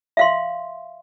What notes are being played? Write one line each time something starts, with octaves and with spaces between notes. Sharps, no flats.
E5 F5 C6